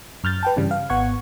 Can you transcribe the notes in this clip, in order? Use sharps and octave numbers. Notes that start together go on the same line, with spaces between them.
F#2 F6 G6 A6
B4 G5 A5
G2 C#3 E3 G3
F5
G#1 B3 F#5 C#6 G#6